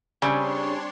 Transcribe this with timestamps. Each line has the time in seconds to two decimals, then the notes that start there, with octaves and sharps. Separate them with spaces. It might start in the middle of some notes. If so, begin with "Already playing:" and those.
0.22 C#3 G3 C4 D4 G4 C#5 G#5 C6